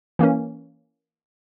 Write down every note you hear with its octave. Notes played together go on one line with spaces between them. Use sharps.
E3 A#3 C#4